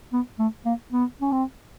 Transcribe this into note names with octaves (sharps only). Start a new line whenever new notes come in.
B3
A3
A#3
B3
C#4
C4